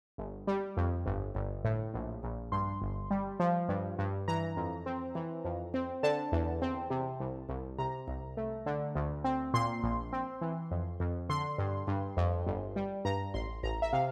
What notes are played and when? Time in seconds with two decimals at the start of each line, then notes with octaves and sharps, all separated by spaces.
0.18 G1
0.47 G3
0.77 F2
1.06 G1
1.35 G1
1.64 A2
1.94 A#1
2.23 A#1
2.52 G2 C6
2.82 G1
3.11 G3
3.40 F3
3.69 G2
3.98 G2
4.28 E3 A#5
4.57 F2
4.86 C4
5.15 E3
5.45 F2
5.74 C4
6.03 D3 A5
6.32 E2
6.62 C4
6.90 C3
7.20 C2
7.49 C2
7.78 C3 A#5
8.08 C2
8.37 A3
8.66 D3
8.95 D2
9.24 C4
9.54 A#2 C6
9.83 A#1
10.13 C4
10.41 E3
10.71 F2
11.00 F2
11.29 D3 C6
11.58 G2
11.88 G2
12.17 F2
12.47 G1
12.76 G3
13.05 G2 A#5
13.34 A1 C6
13.63 A1 A#5
13.82 E5
13.93 C3 F5